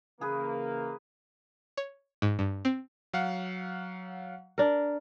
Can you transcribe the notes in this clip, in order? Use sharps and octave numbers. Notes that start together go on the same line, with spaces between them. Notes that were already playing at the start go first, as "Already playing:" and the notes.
C#3 E3 A#3 G#4 B4
C#5
G#2
G2
C4
F#3 F5 F#5
D4 A#4